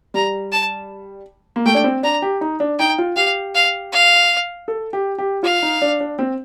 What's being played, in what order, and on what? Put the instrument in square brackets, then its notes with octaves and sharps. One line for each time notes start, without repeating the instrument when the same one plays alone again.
[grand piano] G3 [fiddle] A#5
[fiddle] A5
[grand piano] A#3
[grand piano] A3 [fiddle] G5
[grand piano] D4
C4
[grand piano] D4 [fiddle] A#5
[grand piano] G4
D#4
D4
[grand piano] D#4 [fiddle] G5
[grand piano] F4
[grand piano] G4 [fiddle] F5
[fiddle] F5
F5
[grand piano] A4
G4
G4
[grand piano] F4 [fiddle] F5
[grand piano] D#4
D4
D4
C4